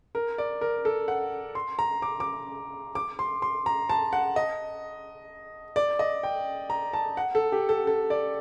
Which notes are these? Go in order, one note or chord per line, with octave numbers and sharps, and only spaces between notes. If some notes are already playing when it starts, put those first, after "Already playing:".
A#4
D5
A#4
A4
F#5
C6
A#5
D6
D6
D6
C6
C6
A#5
A5
F#5
D#5
D5
D#5
G5
A#5
A5
F#5
A4
G4
A4
A4
D5